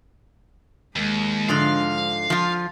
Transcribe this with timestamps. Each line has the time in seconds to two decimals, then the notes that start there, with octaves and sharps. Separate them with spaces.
0.96 D#2 G#3
1.49 G#2 D3 F3 F5
2.30 F3 F4